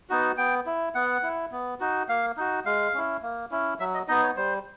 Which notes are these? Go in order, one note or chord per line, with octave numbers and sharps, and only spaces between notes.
B3 D#4 F#4
B3 G5
E4
B3 F#5
E4
B3
D#4 F#4
A#3 F5
D#4 F#4
G#3 F5
C#4 E4
A#3
C#4 E4
F#3 E5
D#5
B3 D#4 D#5
C#5
G3 C5